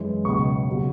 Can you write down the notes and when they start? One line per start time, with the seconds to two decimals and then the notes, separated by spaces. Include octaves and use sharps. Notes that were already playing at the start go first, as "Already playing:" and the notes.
Already playing: F#2 E3 G#3
0.25 C#2 B2 F#3 C#6
0.67 C#2 C#3 F#3